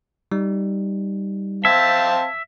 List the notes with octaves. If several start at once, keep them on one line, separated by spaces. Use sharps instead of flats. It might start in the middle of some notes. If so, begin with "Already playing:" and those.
G3 D#4
C4 E5 F5 A5 G#6